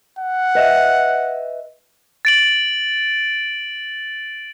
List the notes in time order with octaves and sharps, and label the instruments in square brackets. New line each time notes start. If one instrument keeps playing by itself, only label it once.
[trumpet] F#5
[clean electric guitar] B4 D#5 E5
[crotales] A6 D7 F#7